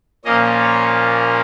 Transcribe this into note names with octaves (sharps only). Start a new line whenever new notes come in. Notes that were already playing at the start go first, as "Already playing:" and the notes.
A#2 F3 A#3 C#4 D#5
C#5